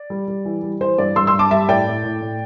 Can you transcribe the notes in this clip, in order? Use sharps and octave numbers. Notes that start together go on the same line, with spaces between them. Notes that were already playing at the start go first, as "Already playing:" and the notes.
Already playing: D5
G3
G3
E3
G3
E3 C5
G2 D5
G2 C6 E6
C6 E6
G2
A5 D6
G3 E5 A5
A2 D5 G5
A2
A2
A2